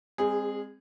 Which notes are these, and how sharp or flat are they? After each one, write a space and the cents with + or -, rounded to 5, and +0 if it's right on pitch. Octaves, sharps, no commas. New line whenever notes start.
G#3 -45 C4 +0 G#4 -10